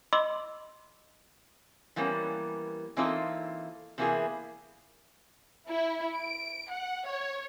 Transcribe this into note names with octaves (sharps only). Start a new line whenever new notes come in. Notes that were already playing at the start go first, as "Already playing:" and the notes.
D#5 B5 C6 D6 E6
E3 F3 G3 A#3 B3 C#4
E3 A#3 C4 D#4 F4 A4
C3 E3 A#3 B3 E4 G#4
E4
D7
F#5
C#5